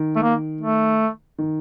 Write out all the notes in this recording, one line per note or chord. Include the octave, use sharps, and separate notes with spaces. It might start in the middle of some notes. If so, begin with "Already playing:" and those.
Already playing: D#3
A3
A#3
A3
D#3